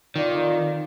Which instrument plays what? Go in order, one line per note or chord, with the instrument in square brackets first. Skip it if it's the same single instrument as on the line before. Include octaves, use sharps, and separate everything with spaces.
[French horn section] F2 F4 D5 [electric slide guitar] D#3